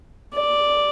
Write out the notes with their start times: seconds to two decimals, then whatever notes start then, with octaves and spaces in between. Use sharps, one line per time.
0.34 D5